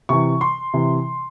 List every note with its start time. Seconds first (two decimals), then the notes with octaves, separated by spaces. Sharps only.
0.09 C3 E3 C#6
0.41 C6
0.74 C3 E3